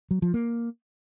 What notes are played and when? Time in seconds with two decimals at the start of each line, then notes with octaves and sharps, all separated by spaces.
0.11 F#3
0.22 F3
0.34 A#3